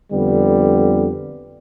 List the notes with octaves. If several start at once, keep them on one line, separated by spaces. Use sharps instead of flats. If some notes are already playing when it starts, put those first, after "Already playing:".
F2 D3 G3 B3